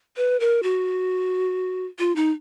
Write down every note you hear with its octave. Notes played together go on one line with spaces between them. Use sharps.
B4
A#4
F#4
F4
D#4